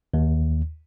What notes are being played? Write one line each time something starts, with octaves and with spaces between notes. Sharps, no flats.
D#2